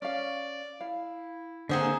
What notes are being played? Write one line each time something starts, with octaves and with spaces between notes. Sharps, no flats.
C#4 D5 F5
E4 F5
D3 A#3 C4 D4 G#4 C5 E5 F#5